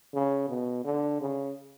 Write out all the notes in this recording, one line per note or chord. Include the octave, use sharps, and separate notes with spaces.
C#3
B2
D3
C#3